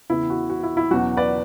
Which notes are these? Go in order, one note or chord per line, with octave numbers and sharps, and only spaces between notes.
E2 C#3 E3 B3 E4
F#4
F#4
E4
E4
E2 B2 F#3 C#4 F#4
B4 D5